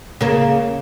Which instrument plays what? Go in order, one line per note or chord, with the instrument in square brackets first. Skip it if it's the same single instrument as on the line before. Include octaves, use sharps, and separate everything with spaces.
[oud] C#3 A#3